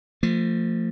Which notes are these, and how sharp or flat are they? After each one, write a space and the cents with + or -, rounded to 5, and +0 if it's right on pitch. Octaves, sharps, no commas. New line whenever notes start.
F3 +0 A3 +35